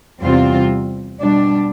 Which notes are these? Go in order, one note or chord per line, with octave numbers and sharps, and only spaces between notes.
E2 C3 G3 C4 F4
B2 G3 D4